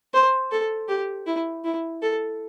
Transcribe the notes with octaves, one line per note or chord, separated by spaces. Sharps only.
C5
A4
G4
E4
E4
A4